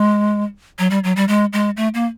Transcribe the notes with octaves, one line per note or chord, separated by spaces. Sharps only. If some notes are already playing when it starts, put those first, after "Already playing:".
Already playing: G#3
F#3
G3
F#3
G3
G#3
G#3
A3
A#3